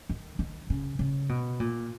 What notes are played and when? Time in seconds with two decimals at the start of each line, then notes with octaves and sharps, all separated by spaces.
0.09 D#3
0.39 D#3
0.70 C#3
0.99 C#3
1.29 B2
1.60 A#2